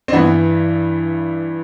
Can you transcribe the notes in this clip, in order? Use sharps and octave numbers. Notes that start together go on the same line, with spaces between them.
C4
G2 E3 B3